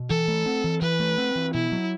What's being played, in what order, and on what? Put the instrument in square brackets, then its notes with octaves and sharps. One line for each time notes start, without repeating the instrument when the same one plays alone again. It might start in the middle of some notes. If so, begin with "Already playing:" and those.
Already playing: [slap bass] B2
[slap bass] E3 [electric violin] A4
[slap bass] A3
C4
E3
[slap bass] E3 [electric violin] B4
[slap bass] A3
C4
E3
[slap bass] B2 [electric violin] E4
[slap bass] F#3